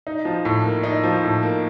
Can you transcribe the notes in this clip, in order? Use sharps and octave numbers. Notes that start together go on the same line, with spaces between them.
D#4
F3
A2
A#3
D#4
F3
A2
A#3